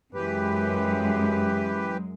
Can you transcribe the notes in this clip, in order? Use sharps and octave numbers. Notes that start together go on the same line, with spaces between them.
F#2 E3 G#3 G4 B4